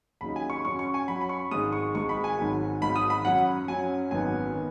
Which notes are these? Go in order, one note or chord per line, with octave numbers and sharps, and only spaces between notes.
D#2 C#3 F#3 D#4 B5
G#5
C#6
F#2 F#3 C#4 C#6
C#6
G#5
F#2 F#3 C#4 B5
B5
C#6
G#1 G#2 D#3 G#3 D#6
C#6
G#1 G#2 D#3 G#3 C#6
B5
G#5
G#1 G#2 D#3 F#3
G#1 G#2 D#3 F#3 B5
D#6
B5
F#2 F#3 C#4 F#5
F#2 F#3 C#4 G#5
G#1 F#2 D#3 F#3 B3 G#5
D#3 B3